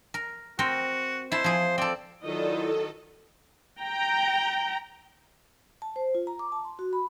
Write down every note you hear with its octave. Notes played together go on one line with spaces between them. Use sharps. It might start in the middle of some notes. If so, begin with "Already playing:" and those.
A#4
C4 F#4 A#4
E4 C5 A5
F3 G#4
C4 A4 D5
D#3 F#3 E4 F4 A4 D5 D#5
G5 A#5
A5
C5
F4
A#5
D6
A5
C6
F#4
B5